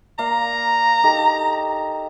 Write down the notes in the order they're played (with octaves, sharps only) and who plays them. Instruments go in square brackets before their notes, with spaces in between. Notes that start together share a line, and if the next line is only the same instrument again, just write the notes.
[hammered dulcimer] A#3 D5 F5 [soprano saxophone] A#5
[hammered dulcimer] D#4 G4 A4